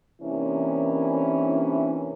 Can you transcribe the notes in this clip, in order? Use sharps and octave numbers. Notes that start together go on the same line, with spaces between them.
C3 E3 A#3 C#4 D4 E4